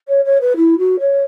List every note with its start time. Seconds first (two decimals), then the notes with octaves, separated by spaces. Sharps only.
0.08 C#5
0.25 C#5
0.41 B4
0.56 E4
0.78 F#4
1.00 C#5